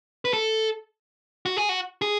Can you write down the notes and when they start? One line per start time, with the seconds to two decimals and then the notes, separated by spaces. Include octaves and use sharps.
0.25 B4
0.33 A4
1.46 F#4
1.57 G#4
1.69 F#4
2.02 G#4